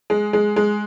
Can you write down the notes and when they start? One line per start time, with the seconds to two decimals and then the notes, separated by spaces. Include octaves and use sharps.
0.10 G#3
0.33 G#3
0.56 G#3